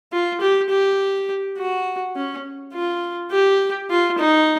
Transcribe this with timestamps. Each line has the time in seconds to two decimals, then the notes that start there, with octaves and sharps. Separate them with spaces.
0.12 F4
0.41 G4
0.70 G4
1.57 F#4
2.16 C#4
2.74 F4
3.31 G4
3.90 F4
4.18 D#4